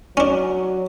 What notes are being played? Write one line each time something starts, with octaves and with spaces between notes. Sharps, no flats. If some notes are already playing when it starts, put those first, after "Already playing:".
F#3 C#4 D4